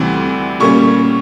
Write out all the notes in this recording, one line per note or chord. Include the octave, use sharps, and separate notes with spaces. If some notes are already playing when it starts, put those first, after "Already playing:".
Already playing: D2 C3 E3 G3 C4
A#2 G3 A#3 C#4 C#6